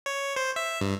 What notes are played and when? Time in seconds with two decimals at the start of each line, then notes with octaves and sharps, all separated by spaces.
0.06 C#5
0.36 C5
0.56 E5
0.81 G2